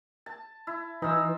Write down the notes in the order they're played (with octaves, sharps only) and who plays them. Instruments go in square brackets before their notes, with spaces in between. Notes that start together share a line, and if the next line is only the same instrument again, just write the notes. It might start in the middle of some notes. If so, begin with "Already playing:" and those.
[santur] A5
E4
[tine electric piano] E3 [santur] D#4 F4 E6